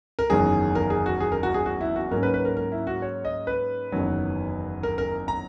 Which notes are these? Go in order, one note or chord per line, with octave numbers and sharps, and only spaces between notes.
A#4
F#1 E2 D#3 F#3 G#4
A#4
G#4
F#4
G#4
A#4
F#4
G#4
F#4
E4
F#4
G#2 F#3 A#3 C#4 A#4
B4
B4
A#4
A#4
E4
F#4
C#5
D#5
B4
F#1 E2 D#3 F#3
A#4
A#4
A#5